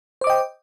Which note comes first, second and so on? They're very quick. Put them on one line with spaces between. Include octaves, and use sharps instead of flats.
C5 D6 D#5 G5